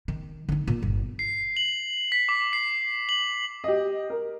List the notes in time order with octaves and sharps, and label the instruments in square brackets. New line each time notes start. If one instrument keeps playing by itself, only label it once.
[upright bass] D#3
D3 D#4
A#2
G1
[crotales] C7
F#7
B6
D6
C7
F#7
[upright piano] G4 D#5
A#4